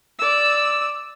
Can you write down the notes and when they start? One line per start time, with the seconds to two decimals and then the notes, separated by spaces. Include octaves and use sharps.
0.19 D5 E6